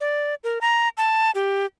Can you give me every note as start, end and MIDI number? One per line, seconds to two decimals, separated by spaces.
0.01 0.35 74
0.44 0.59 70
0.61 0.88 82
0.97 1.31 81
1.35 1.66 67